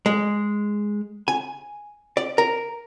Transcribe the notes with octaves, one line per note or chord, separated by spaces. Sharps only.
G#3
G#5
D5
A#4